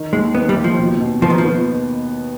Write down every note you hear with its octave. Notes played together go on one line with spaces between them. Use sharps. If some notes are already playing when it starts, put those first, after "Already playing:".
Already playing: D#3
D#2 G#3
D#3 B3
G3
D#2
F3
B2
B2
F3 B3
D#3
F3
B3